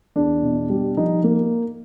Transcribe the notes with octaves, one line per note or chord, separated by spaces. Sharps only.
E2 D4
B2
G3
F3 D#4
A#3